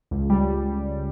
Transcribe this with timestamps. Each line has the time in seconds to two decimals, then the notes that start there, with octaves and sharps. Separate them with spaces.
0.11 C#2
0.30 G3